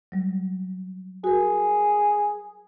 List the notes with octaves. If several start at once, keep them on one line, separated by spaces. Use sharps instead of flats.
F#3 G3
F#4 G#4 A#4